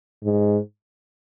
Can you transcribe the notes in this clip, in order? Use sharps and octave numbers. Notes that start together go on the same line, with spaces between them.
G#2